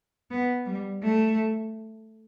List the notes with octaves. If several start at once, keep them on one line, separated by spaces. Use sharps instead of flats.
B3
G3
A3